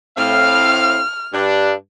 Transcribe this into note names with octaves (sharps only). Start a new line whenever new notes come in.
A2 C4 F5 F6
G2 D4